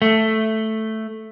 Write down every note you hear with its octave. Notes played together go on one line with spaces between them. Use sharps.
A3